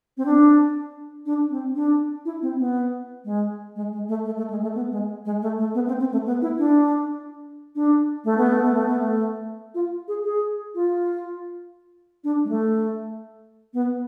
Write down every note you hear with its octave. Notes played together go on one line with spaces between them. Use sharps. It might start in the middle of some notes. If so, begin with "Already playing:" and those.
C4
D4
D4
C4
D4
E4
C4
B3
G#3
G#3
G#3
A3
A3
A3
G#3
A3
B3
G#3
G#3
A3
A3
B3
C4
C4
A3
B3
E4
D4
D4
A3
B3
A3
B3
A3
B3
A3
F4
G#4
G#4
F4
D4
G#3
A3
B3